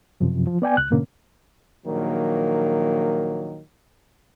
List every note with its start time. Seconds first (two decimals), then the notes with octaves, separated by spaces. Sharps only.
0.20 F#2 C3 F3
0.47 F3
0.62 B3 D5 G5 G#5
0.77 C#2 F#6
0.90 G#2 B2 D3 A#3 C#4
1.86 A#1 D#3 F#3 A#3